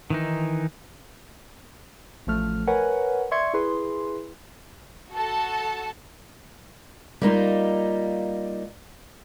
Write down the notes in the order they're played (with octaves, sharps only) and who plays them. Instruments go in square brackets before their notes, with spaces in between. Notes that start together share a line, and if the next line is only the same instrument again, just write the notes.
[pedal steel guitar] D#3 E3 D#4
[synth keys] A1 F3 A3 F6
A#4 B4 C#5 F#5 G#5
D5 E5 C6 C#6 G#6 C#7
E4 G#4 B4 C6
[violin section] F#4 A4 A5
[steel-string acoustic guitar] G3 A#3 D#4 F4